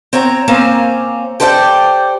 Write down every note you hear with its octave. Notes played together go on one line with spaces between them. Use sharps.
C4 C#5 F#5 A#5
A#3 C4 C#4 C5 F5
G4 A4 C5 D5 F5 G5